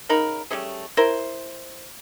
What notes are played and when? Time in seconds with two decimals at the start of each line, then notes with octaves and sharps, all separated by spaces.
0.09 C#3 D#4 A#4 B5
0.51 G3 A3 C#4 G#4
0.97 E4 A#4 C5